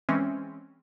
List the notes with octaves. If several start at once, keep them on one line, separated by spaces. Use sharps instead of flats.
E3 G#3 C4 C#4